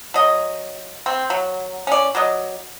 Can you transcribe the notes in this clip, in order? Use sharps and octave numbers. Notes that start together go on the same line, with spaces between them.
F#3 D#5
C4
F#3
C#4 D5
F#3 D5 D#5